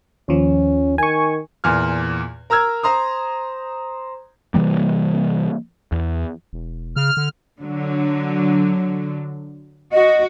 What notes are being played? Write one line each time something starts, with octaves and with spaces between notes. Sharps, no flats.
D#2 F3 C#4
D#3 G#5 C#6
E2 A#2 G#5 F6
A#4 A#5 E6 F6 G#6
C5 A#5 C6 D#6
C3 E3 G3 A#3
E2
E1
C#3 F6
D3
D3 F#3
F#4 D#5